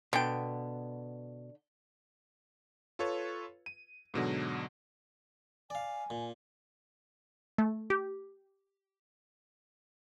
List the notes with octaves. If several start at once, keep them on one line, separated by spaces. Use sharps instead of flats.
B2 D3 B3 G5
F4 A4 B4 C#5
D#7
G#2 B2 D3 F#3
D5 F5 G#5
A#2
A3
G4